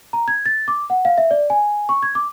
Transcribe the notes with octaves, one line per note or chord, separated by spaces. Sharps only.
A#5
G#6
A6
D6
F#5
F5
E5
D5
G#5
C#6
G#6
D6